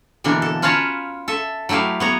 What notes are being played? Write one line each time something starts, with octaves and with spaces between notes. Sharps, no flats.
B2 D3 E3 A#3 D4
A4
C#4 F4 B4 C#5 A5 A#5
A4 E5
F#3 A3 E4 G4 F5
B3 C#5 A#5